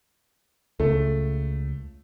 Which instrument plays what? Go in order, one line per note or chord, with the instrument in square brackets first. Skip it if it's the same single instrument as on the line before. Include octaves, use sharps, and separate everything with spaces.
[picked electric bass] C#2 [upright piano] A3